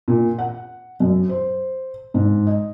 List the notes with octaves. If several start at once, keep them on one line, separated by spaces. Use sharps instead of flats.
A#2
F#5
F#2
C5
G#2
D#5